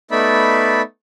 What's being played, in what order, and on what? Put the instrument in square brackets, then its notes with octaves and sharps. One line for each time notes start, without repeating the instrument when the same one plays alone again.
[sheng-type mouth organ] A3 B3 D#4 D5 E5 B5